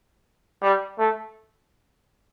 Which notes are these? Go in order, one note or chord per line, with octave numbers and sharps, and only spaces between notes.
G3
A3